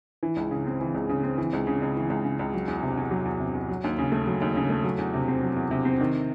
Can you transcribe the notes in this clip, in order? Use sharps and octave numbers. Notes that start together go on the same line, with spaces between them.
E3
C#2
C#3
C4
E3
C#2
C#3
C4
E3
C#2
C#3
C#2
E3
C#2
C#3
C#2
F#3
E2
C3
E2
F#3
E2
C3
E2
F#3
D#2
C#3
A3
F#3
D#2
C#3
A3
F#3
E2
C3
C4
F#3
E2
C3
C4
D#3